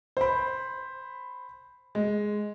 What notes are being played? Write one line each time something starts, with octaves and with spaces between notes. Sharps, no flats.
C5 B5
G#3